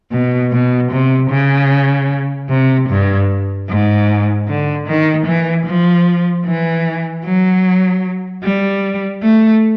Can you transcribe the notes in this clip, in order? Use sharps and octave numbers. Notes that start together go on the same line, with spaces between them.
B2
B2
C3
C#3
C3
G2
G#2
D3
D#3
E3
F3
E3
F#3
G3
A3